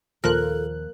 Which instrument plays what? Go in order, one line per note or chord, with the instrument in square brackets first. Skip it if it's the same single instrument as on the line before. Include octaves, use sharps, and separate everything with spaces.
[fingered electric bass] D#2 [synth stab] A#2 F3 F#6 [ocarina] A4 [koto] A#4